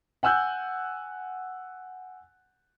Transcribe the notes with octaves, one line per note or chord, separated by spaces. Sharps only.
F#5 G#5 E6 F#6 G6